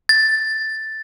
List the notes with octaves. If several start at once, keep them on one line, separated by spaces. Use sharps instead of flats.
A6